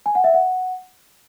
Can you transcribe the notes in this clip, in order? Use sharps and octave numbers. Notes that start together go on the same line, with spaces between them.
G#5
F#5
E5
F#5